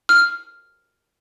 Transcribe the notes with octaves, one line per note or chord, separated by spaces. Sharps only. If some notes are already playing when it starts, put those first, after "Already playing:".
F6